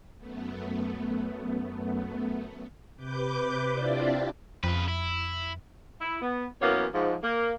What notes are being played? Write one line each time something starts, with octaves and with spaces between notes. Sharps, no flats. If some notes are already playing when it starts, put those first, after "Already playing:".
F#2 A3 B3
C3 B4 D6 G6
C4 D4 E4 F4 G4 D5
F2 C#3 B4
E4
E4
B3
F#2 E3 A#3 B3 C#5
G#2 F3
A#3